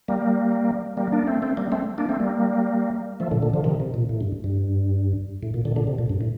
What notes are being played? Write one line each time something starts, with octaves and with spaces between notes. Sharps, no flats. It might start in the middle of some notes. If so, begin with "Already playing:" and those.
G3 A#3
G3 A#3
A#3 D4
A3 C4
A3 C4
G3 A#3
A3 C4
A#3 D4
A3 C4
G3 A#3
F3 A3
A#2 D3
A#2 D3
D3 F3
C3 D#3
C3
A#2
A2
G2
G2
A2
A#2
A#2 D3
A#2 D3
C3
A#2
G2
A2